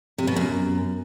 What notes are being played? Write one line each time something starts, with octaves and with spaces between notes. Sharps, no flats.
C3
B2
F#2